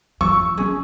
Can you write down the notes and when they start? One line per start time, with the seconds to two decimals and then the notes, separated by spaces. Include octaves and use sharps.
0.21 F3 F4 C#6 E6
0.58 F3 C#4 G#4